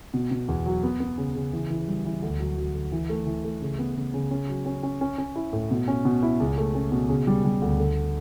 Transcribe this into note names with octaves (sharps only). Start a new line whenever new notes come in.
B2
B2
E2
F#3
B3
B3
C#3
C#3
E3
E3
G3
E3
D2
F#3
F#3
D3
E3
A3
E3
A3
C#3
B3
C#3
C#3
C#4
F#3
C#4
C#4
C#4
C#4
E4
A2
B2
C#4
B2
E4
C#2
A3
C#4
B2
C#3
G3
G3
D2
D3